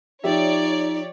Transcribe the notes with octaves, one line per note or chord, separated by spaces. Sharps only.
F3 D#4 G4 C#5 D5 E5